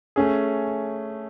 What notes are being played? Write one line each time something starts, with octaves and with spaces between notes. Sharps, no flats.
A3 C#4 G#4